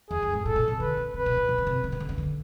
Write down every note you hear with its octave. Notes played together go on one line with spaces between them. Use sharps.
E2 G#4
F2
G#2
A2 A4
A#2
C3
D3 B4
C#3
C3 B4
B2
B2
C3
C#3
C3
D3
D#3
D3
C#3
D3